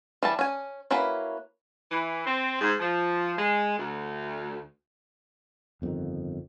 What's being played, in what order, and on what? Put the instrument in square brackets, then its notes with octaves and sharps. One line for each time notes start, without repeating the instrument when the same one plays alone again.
[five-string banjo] E3 G3 A5
C#4 G#5
A#3 C#4 E4 F#4 B4
[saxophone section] E3
C4
G#2
F3
G#3
D2
[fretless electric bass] G1 F2 B2 D#3